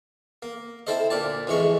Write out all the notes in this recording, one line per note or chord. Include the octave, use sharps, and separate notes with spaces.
A#3
C4 E4 A4 C5 D#5
D2 A#2 D5 A5
F2 A2 E3 G#3 C#6